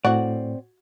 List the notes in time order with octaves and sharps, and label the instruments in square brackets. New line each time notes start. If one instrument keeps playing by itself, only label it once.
[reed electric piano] A2 [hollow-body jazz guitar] C4 D5 [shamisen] F#4